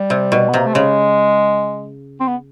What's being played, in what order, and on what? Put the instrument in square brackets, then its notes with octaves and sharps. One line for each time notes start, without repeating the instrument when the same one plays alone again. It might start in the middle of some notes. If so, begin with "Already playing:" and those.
Already playing: [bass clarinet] G3
[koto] C3
B2
[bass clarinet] B3
[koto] C3 [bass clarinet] A#3
[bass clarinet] A3
[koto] C#3 [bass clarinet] G#3
[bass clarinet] C4
B3